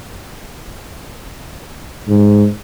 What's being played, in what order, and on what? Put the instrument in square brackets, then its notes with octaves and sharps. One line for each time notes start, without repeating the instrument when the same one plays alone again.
[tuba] G#2